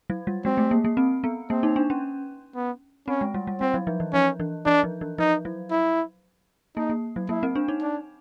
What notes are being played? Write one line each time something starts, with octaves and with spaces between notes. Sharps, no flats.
F#3
G3
G#3 C4
A3
A#3
A#3
C4
B3
A#3 C4
D#4
D4
C#4
B3
C4 C#4
G#3
G3
G3
G3 C4
F#3
F3
E3
F3 C#4
E3
E3 D4
F3
E3
F3 D#4
F#3
E4
A#3 D#4
A#3
F#3
A#3 E4
C4
D4
D#4
D4